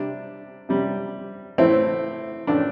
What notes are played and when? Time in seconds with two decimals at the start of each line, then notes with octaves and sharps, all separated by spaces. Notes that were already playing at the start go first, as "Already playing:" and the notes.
Already playing: C3 G3 D4
0.69 C3 G3
1.58 A2 E3 A3 C4 E4
2.47 A2 E3 A3 D4